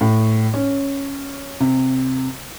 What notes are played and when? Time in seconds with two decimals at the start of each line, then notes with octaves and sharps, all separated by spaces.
0.01 A2
0.54 C#4
1.60 C3